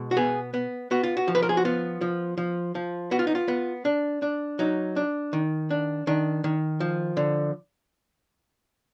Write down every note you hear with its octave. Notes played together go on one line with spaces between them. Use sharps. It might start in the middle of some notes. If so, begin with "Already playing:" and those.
Already playing: B2 G#3
F#4
B3 G#4
B3
B3 F#4
F4
F#4
F3
B4
A#4
G#4
F#4
B3 F4
F3
F3
F3
B3 F#4
F4
D#4
F4
B3
D4
D4
F#3 D#4
D4
D#3
D4
D#3 D4
D#3
F3
D3